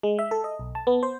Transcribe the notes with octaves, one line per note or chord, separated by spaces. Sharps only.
G#3
E5
A4
D#5
B1
A5
B3
C5